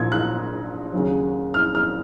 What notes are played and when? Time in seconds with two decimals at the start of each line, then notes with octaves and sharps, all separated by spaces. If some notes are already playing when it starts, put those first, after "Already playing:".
Already playing: A#1 A#2 F3 G#6
0.12 F#6
0.93 D#2 C#3 F#3
1.54 F6
1.75 F6